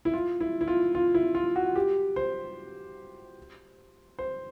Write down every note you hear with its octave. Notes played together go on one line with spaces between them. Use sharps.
E4
F4
E4
E4
F4
F4
E4
F4
F#4
G4
C5
C5